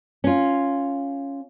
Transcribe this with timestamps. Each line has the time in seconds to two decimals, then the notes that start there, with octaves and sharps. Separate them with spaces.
0.24 C#4 F4